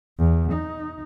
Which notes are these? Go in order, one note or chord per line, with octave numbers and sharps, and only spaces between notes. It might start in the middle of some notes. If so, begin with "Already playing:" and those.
E2
D#4